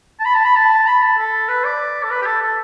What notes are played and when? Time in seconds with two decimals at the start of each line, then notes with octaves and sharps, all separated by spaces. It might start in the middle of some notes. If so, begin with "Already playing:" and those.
0.19 A5
0.25 B5
0.35 A5
0.45 B5
0.56 A5
0.87 B5
1.02 A5
1.18 A4
1.49 B4
1.64 D5
2.03 A4
2.11 B4
2.21 G4
2.26 A4
2.42 A4